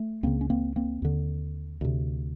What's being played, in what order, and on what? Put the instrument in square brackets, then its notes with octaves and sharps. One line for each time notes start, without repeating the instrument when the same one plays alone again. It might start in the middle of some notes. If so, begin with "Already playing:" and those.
Already playing: [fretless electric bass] A3
C#2 C#3 A#3 C4
C#4
A#3 C4
A#3 C4
D#2 D3
D2 C3